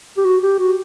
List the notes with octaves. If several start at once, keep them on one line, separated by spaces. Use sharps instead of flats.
G4
F#4
G4
F#4